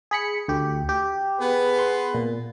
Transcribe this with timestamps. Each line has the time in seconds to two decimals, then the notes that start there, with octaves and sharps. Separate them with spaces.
0.11 G#4 B5 C#7
0.48 D2 G4
0.89 G4
1.40 B3 G#4 B4
1.79 C6
2.14 A#2